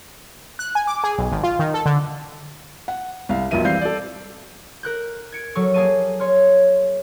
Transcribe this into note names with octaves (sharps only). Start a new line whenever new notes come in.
F#6
G#5
D6
G#4
B1
G#1
F4
D#3
A4
D3
F#5
C2 F5
B1 F2 F3 A#3 E5 D#7
E3 G3 C4 F5 G6 C7
A4 D5
A#4 F#6 G6
G#6 C#7 D7
F#3 A4 C#6 F6
A#3 G#4 F5 A5 C#6 D#7
C#5 C6 F6